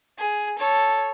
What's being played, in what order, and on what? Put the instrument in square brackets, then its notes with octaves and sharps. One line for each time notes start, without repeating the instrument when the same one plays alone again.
[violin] G#4
A4 C#5